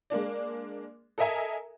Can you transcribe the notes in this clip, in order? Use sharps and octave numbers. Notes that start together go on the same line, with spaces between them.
G#3 A#3 D4 D5
A4 A#4 D#5 E5 G#5 A#5